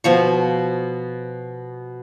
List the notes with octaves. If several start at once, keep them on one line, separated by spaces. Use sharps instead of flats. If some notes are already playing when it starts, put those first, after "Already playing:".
B2 F3 C#6